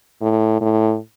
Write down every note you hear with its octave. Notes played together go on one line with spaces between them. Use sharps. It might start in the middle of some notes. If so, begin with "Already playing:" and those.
A2
A2